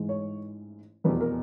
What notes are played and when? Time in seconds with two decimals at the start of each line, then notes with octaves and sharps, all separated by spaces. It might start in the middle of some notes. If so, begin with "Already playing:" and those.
Already playing: A1 G#2 E3 G#3
0.09 C#5
1.04 F1 E2 B2 B4
1.21 A#4